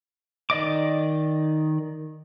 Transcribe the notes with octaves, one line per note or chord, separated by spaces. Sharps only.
D#3 D5 D#5 D6